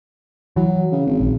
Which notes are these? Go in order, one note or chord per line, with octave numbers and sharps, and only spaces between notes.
E3 F#3
C#3
G#1
A#1